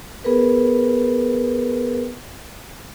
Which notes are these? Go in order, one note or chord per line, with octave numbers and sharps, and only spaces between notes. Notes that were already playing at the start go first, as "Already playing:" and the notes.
B3 G#4 A#4 B4